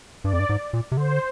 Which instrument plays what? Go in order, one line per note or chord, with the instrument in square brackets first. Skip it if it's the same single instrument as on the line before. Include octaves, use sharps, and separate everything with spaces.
[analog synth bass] G2 [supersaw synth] D5
[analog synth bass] F2
G2
G#2
A#2
C3
[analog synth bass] D3 [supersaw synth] C5